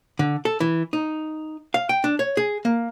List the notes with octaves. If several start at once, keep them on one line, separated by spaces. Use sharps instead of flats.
D3
A4
E3
D#4
F5
G5
D4
C#5
G#4
A#3